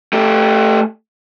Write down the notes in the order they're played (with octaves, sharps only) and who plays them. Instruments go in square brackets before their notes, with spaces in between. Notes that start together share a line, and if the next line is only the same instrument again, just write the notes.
[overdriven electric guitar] A3 G4